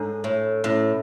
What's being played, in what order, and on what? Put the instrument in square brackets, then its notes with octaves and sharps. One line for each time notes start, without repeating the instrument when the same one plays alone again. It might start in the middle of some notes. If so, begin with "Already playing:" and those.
Already playing: [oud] G#2 [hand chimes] D4 A4 C#5
[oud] A2
[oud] A2 [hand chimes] C#4 E4 A4 E5